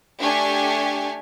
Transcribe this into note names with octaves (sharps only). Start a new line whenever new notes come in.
A3 D4 G4 G#5 C#6